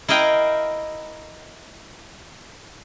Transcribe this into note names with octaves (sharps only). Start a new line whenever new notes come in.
E4 A#4 D#5 F5 G5